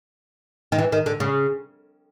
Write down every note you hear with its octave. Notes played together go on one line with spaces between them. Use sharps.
D#3
E3
D#3
D3
C#3